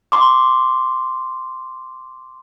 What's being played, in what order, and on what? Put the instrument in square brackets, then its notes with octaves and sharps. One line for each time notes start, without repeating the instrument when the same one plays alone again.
[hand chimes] C6 D6